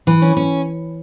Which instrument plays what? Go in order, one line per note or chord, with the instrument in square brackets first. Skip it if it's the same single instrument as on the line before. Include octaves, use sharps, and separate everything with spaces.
[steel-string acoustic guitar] E3
C#4
C#4